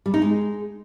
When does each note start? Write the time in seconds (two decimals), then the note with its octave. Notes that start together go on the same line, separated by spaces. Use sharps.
0.06 G3
0.14 D#4
0.22 G#3